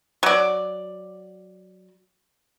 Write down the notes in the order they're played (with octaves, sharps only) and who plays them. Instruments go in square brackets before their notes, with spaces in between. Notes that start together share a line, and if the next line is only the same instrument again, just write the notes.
[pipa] F#3 D5